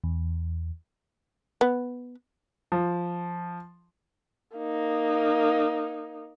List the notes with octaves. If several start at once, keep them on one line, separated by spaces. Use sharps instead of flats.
E2
B3
F3
A#3 D#4